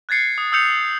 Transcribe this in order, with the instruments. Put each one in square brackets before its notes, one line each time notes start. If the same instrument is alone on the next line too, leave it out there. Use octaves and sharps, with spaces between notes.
[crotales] F#6 G#6 A6 C7 C#7
D#6
D#6 E6 G6 C#7 F7